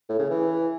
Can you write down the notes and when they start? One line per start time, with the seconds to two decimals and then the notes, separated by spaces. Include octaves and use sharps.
0.09 A2
0.19 C#3
0.30 E3